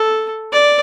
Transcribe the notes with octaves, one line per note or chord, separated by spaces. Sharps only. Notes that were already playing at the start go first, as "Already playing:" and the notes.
Already playing: A4
D5